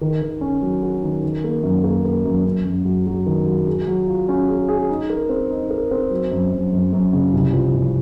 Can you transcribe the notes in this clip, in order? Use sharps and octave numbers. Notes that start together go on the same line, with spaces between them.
D#3
D#3
C#4
F#3
F#4
D#3
D#3
A#3
F#2
A#3
A#3
F#2
F#2
F#2
F#3
F#3
D#3
F#3
G#4
F#3
F4
C#4
G#4
G#4
D#4
A#4
C4
D#4
A#4
C4
F#3
F#2
F#2
F#2
F#2
C#3
C2
F3
C2